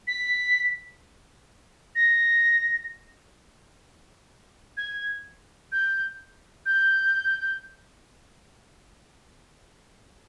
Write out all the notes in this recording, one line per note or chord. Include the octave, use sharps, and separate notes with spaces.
B6
A#6
G#6
G6
G6